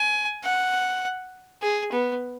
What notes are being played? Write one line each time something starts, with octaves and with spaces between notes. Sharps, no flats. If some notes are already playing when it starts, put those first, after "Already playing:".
Already playing: G#5
F#5
G#4
B3